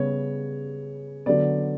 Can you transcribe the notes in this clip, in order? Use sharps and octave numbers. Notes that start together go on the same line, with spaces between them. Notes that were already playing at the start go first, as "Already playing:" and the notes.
Already playing: C#3 G3 B3 C#5
D3 F#3 B3 D5